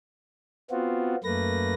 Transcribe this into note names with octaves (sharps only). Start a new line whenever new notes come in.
B3 C4 F4 F#4
F#2 A3 A#3 B4 A#6